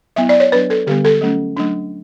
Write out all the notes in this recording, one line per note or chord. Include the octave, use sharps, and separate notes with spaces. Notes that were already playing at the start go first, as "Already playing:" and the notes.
F#3 B3 E4 E5
D5
C#5
F#3 B3 D4 B4
A4
D3 G3 B3 G4
A4
F#3 A3 C#4
F#3 A3 D4